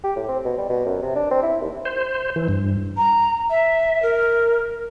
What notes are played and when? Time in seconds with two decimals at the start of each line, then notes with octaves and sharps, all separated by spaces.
0.04 G4
0.16 A2
0.28 C4
0.45 B2
0.58 G3
0.69 B2
0.86 F#2
1.02 C3
1.15 D4
1.31 C4
1.43 E4
1.61 D#2
1.85 C5
2.36 E3
2.48 G2
2.97 A#5
3.50 E5
4.03 A#4